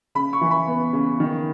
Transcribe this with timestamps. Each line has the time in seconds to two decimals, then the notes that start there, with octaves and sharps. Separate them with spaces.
0.15 C#3 B5
0.33 C#6
0.41 E3
0.51 B5
0.67 B3
0.93 C#3
1.20 D#3